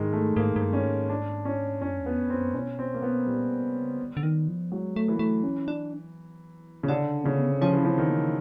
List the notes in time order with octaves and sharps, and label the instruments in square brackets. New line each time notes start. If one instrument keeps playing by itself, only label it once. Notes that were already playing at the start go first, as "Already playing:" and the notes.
Already playing: [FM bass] G#2 [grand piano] D#3 G#3
[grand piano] A3
[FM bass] G#2 [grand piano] A#3
[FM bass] G#2
G2
[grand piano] C#4
[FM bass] G#2
[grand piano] D4
C#4
[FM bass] F#2 [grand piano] C#4
[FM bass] E2
[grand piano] B3
[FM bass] F2
[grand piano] C4
[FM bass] F#2
[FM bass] B2 [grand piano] C#4
[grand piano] C4
A#3
B3
[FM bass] A#2 [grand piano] G3
[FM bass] B2
C3
C#3
D3
D3
D#3
F3
[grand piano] F#3 [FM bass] G#3
[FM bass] A3
[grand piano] E3
[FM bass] A#3
A3
C#4
D4
[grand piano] C#3
[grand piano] D3 [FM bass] D4
[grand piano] C#3 [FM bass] A#3
[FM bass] B3
C4
[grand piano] F3 [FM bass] C#4
[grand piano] E3
[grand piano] F3 [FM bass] C4
[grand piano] D#3
[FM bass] A#3